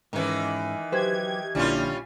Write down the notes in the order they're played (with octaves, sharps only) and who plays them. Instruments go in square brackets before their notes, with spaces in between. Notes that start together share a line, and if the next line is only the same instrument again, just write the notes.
[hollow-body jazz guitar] G#2 C#4 [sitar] D#3 E3
[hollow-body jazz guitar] F#3 B4 C5 [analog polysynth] G4 G#6
[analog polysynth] A#1 A#2 [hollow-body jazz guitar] D3 D4 E4 [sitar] G3 C#4 F4